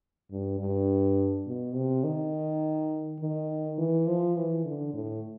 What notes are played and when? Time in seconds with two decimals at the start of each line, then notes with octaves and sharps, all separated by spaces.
0.31 G2
0.60 G2
1.47 B2
1.75 C3
2.04 D#3
3.20 D#3
3.78 E3
4.07 F3
4.37 E3
4.65 D3
4.94 A2